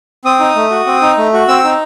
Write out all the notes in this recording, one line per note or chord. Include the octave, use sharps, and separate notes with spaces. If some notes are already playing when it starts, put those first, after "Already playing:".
C4 D#6
D#4
A3
F#4
C4
D#4
A3
F#4
C4 E6
D#4